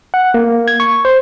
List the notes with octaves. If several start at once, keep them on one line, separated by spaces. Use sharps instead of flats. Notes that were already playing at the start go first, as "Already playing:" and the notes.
F#5
A#3
G#6
C#6
C5